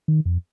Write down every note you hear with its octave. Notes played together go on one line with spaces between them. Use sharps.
D#3
F2